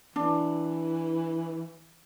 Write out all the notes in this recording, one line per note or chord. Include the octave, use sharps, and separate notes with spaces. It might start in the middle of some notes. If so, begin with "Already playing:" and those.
E3 D4